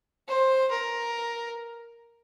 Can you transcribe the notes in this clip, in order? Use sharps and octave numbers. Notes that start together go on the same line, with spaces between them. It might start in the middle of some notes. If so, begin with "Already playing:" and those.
C5
A#4